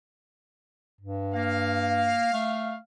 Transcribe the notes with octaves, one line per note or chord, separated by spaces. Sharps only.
G2
A#3 F5
A3